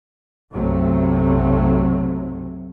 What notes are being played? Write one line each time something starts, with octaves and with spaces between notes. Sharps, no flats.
B1 F#2 C3 F#3 A3